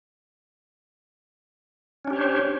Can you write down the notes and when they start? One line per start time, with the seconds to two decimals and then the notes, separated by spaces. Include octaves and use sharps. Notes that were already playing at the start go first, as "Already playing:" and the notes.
2.05 C#4
2.07 D4
2.10 G4
2.13 C#5
2.16 C5